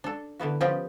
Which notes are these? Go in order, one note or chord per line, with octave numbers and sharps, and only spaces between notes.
D4 A4
D3 E3 B3 F#4
F3 B3 C#4 G4 D5 D#5